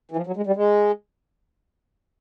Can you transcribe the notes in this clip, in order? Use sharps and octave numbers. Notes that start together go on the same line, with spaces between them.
E3
F3
F#3
G#3
G3
G#3